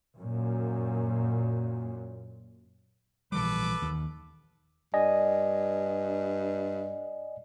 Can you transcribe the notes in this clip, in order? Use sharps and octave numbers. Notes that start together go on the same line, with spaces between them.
F#2 A#2
A#1 E3 G3 A4 B4 D6
D#2
G2 D5 D#5 G#5